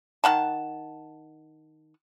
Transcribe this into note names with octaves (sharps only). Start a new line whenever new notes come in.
D#3 F#5 A5